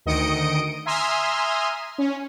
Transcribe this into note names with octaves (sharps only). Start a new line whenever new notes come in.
D2 D#3 D#5 D#6 C#7 D7
E5 G#5 A#5 C6 D#6 F6
C#4